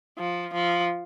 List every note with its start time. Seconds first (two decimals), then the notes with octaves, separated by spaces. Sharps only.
0.18 F3
0.54 F3